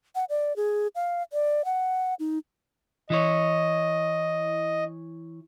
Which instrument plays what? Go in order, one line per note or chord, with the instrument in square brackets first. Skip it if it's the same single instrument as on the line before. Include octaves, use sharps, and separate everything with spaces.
[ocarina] F#5
D5
G#4
F5
D5
F#5
D#4
[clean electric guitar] E3 E4 C#5 [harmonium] D#5